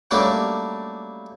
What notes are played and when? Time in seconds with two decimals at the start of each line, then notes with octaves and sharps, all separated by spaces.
0.11 F#3 G3 A3 A#3 C#4 D4